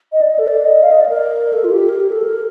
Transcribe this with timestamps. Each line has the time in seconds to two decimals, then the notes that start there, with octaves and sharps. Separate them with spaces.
0.12 D#5
0.21 D5
0.30 D#5
0.39 A4
0.47 D5
0.65 D#5
0.83 F5
0.91 D#5
1.00 D5
1.09 A#4
1.53 A4
1.64 F4
1.71 G4
1.89 A#4
2.00 G4
2.12 A4
2.23 A#4